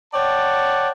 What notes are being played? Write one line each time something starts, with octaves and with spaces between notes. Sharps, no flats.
C#5 D5 F#5 G5 A5